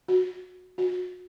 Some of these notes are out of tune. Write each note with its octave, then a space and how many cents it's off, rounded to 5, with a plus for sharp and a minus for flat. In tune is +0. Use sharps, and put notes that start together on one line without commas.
F#4 -20
F#4 -35